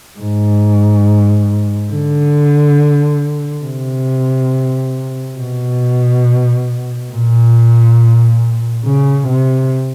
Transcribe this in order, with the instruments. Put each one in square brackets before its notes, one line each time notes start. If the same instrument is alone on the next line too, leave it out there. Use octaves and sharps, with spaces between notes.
[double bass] G#2
D3
C3
B2
A#2
C#3
C3